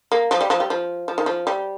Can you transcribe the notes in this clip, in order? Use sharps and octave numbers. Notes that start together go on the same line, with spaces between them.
A#3
F3
G3
F3
G3
F3
F3
D#3
F3
G3